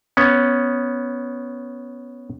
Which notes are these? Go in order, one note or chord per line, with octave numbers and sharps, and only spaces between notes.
B3 C#4